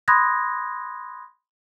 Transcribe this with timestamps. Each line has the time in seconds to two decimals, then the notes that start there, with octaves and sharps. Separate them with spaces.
0.08 B5 C6 D#6 F#6 G#6 A#6